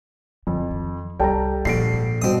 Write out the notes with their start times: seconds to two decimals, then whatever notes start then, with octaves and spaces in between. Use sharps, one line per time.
0.47 F2 D3
0.71 D#3 F#3
1.20 C2 G3 A4 G5 A5 A#5
1.65 A#1 A#2 D3 C7 D7
1.94 G#2
2.22 B1 G2 B2 C4 F#4 D#6